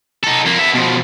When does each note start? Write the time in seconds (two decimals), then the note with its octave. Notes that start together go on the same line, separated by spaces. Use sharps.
0.23 D#4 A4
0.45 F2 A#3
0.59 B3 E5
0.74 B2 F3